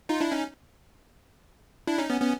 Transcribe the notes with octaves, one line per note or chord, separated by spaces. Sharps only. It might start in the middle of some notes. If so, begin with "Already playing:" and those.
D#4 F4
D4 E4
C#4 D#4
D4 E4
C#4 D#4
B3 C#4
B3 C#4